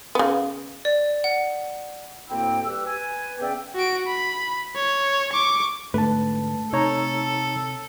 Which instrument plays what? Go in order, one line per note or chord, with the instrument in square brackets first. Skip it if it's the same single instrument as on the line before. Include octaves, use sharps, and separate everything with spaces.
[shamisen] C#3 B3
[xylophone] D5
F#5
[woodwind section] D2 A2 A#3 C4 E4 G5
G3 G4 B4 E6
B4 G#5
C#3 B3 D5 E5 G5
[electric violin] F#4 D7
B5
C#5
C#6 D6
[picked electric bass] G#2 D3 [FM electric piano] A3 A5 [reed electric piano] B4
[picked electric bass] C3 [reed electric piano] D#4 C#5 A#5 [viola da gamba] A4